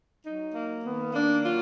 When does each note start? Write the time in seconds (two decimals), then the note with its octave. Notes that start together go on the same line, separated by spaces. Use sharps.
0.23 F#3 D#4
0.53 A#3
0.82 D#3 B3
1.11 A#3 D4
1.42 F#3 F4